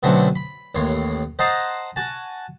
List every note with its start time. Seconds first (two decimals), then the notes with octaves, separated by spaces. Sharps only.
0.03 B2 D3 F#3 A3 C4 C#4
0.36 B5
0.75 A1 D#2 C#5 C6
1.39 C5 D#5 F#5 A5 A#5 C6
1.96 F#4 G#5 A5